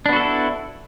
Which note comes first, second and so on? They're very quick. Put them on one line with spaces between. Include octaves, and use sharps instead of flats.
D4 B3 F#4 A4 E4